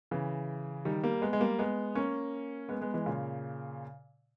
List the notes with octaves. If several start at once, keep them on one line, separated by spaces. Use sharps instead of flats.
C#3 E3
D#3 G3
G3 A#3
G#3 B3
G#3
G3 A#3
G#3 B3
A#3 C#4
G#3 B3
G#3 B3
E3 G#3
A#2 C#3